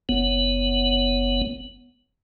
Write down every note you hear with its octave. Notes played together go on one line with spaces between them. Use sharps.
F#1 B3